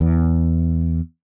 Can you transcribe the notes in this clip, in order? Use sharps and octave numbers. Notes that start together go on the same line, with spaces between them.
E2